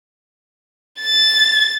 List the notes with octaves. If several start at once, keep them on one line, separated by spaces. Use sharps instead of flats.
A6